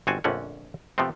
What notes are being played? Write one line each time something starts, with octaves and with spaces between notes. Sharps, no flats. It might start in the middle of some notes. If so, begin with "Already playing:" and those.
G1 C4 F#4 G#5 A5
A#1 F2 D3 A3 C#4 F#5
C3 F3 A3 B3 C4